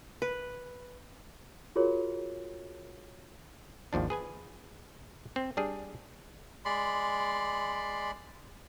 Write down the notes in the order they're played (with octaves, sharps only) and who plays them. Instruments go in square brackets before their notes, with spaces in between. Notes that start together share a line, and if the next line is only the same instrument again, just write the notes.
[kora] B4
[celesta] F4 F#4 G#4 A#4 C#5
[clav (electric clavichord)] G#1 D#2 F3 D4
G#4 B4 G#5
C4
G3 D4 G#4
[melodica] G#3 D5 B5 C6